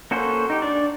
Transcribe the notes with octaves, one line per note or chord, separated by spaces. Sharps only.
A#3 C#4 F#4 A4 C5
D#4 G4
D4 D5